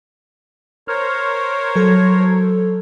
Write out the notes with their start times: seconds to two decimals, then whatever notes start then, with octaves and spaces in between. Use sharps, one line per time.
0.88 A#4 C5 C#5 F6
1.76 F#3 A4